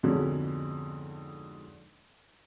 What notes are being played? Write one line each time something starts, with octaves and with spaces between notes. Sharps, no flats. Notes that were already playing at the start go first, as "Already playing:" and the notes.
F2 G#2 B2 D3 G#3 C#4